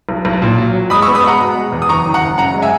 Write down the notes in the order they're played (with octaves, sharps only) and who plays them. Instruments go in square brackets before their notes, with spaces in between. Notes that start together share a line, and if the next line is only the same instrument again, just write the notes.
[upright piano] B1
B1
A#2
F#3
F#3
G#3 B5 D#6
C#6 E6
B3
B5 D#6
G#3 F#5 A#5
B2
G#3
E2
D#6
F#1 A#5 C#6
D#3
F#5 A#5
F#1
F#2 F#5 A#5
G#3
E5 G#5